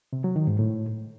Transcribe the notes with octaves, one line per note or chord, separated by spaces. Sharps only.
C3
F#3
D#3
G#2
A2